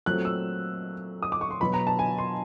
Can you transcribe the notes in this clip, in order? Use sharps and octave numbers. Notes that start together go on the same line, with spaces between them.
A#2 F#3 A3 C4 F#6
E6
D#6
D6
C#6
C6
B2 F#3 B3 B5
A#5
A5
G#5
C6